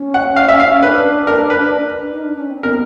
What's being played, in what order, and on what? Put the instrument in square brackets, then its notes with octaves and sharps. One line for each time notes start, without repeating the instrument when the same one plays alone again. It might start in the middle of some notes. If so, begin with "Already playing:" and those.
Already playing: [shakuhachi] C#4
[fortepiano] F#5
F5
E5
F5
[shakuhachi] C#4
[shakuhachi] D4 [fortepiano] B4
[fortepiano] A#4
B4
[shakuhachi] D#4
D4
C#4
C4
[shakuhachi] B3 [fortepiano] A#4